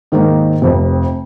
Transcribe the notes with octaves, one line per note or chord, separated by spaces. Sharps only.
G#2 D#3 A#3 D#4
F1 F2 C3